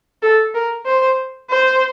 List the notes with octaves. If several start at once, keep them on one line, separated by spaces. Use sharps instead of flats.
A4
A#4
C5
C5